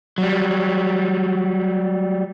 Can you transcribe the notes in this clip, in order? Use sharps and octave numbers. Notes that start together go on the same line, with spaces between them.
F#3 G3